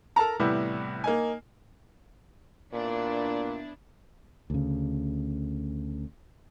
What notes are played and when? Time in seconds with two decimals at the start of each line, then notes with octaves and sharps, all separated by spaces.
0.16 A4 A#4 A5 A#5
0.39 A2 C3 E3 G3 B3 E4
1.04 A#3 D#4 G#5
2.73 A#2 B3 D4 E4
4.50 D2 C#3